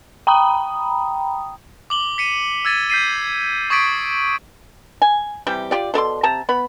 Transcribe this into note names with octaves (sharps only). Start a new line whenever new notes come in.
G5 A#5 B5 D#6
D6 F#7 G7
B6 C#7 D#7
E6 G#6 A6 D#7
G6 B6 C7 D#7
C#6 D#6 G#6 A6 B6 D7
G#5
C3 E3 G3 G4
F4 G4 D5
B2 A4 D5 C6
C3 A5 A#5
B3 B5